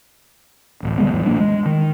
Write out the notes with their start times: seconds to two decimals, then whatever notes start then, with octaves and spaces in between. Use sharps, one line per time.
0.83 D1 A1
0.98 D3 G3 G#3 B3
1.13 A1 E2 E3
1.26 A1 C#3 A#3 D4
1.40 G#3
1.66 D#3